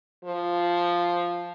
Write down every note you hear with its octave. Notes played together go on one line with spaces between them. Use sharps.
F3